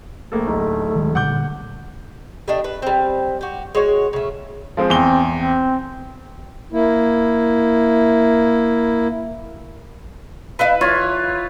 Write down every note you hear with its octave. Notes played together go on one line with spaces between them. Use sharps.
A#1 A3 A#3 A4
D1 D#4
D#3 G#3
A#2 D3 G3 F#5 D6 G6
G3 A3 D4 D#5
B4
G3 C4
F#4 G4
G#3 F#4 C#5
C#3 A3
F3 G#3 C4
E2 C4 G7
C4
A#3 E4
E4 B4 D#5 F5
E2 E4 F4 C#5